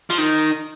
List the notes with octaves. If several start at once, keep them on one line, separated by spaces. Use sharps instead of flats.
F3
D#3